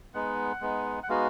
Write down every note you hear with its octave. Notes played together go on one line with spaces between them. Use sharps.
G#3 B3 D#4 F#5
G#3 B3 D#4
F#5
G#3 B3 D#4 F#4 F5